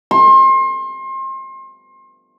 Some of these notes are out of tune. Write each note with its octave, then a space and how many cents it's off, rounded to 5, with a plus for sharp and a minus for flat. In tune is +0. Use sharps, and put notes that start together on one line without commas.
C6 +35